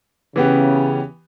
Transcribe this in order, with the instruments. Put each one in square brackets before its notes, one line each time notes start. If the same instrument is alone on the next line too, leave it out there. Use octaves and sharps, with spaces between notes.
[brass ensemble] C#3 [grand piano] E3 B3 G4